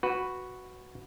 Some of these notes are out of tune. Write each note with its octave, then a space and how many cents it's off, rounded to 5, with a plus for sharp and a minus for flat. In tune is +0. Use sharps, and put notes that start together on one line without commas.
F#4 +0 B4 +0